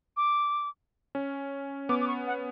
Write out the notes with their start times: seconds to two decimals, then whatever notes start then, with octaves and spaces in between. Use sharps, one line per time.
0.17 D6
1.15 C#4
1.89 B3 D6
2.01 D6
2.08 C#6
2.27 F#5